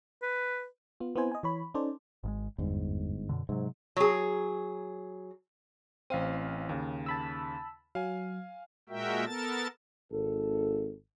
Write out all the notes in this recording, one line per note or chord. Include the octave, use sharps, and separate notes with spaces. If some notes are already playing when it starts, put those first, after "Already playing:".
B4
B3 F4
B3 C4 E4 C5 G#5
D#5 G#5
E3 C#5 B5
C#4 D#4 A4 C5 D5
G#1 D#3 G#3
G1 E2 G#2
F#2 B2 D3
G#2 C3 F#3
F#3 G#4
A1 C4 F5 D#7
D#2 C#3
A5 B5 E6
F#3 F5 G#5
A#2 G#3 F#4 A#4 E5 G5
B3 A4 A#4 A5 A6
G#1 A4